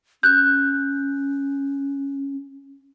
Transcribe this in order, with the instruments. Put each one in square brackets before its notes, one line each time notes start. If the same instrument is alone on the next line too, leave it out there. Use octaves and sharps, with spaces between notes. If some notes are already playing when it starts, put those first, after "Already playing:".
[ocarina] C#4 [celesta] F#6 G6